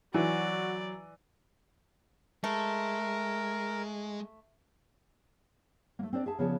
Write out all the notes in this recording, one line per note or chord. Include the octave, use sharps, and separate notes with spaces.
E3 F#3 F#4 D5
G#3 A3 A#4
A3 A#3
C4 D4 C5 D5
G#4 E5 A5
C#3 F3 B3 G#4 D5 A5